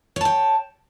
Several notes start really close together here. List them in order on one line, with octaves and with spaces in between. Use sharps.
C#5 A5 G5